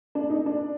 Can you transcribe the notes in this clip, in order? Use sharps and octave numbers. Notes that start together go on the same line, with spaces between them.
D4
D#4
D4